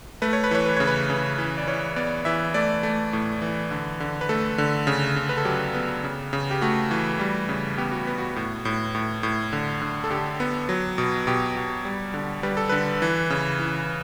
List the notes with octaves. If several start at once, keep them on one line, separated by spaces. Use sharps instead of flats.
A3 B4
C#5
B4
E3 C#5
B4
C#3 C#5
B4
C#3
E3 B4
D5
E3 C#5
B3 D5
E3 E5
A3 D5
A3
A2
E3
D3
D3
B4
A3 A4
D3
C#3
C#3
B4
A4
F#3 G4
B3
C#3
C#3
G4
A3 F#4
E3
G3
C#3
B3 G4
F#4
B3
F#4
A2
A2
A2
A2
D3
D3
A4
D3 G4
B3
F#3
B2
B2 G4
B2
G3
D3
G3 B4
A4
D3 B4
E3
C#3
E3